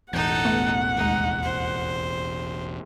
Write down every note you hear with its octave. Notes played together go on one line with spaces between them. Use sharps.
E1 A1 D#4 A4 F#5 G6
A3 B3
D#2 G#3 D#4
C5